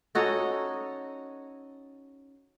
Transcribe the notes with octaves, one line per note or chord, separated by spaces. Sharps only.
C#4 D#4 F#4 A4